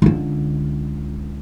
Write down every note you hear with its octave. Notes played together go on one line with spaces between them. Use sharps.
C#2 D3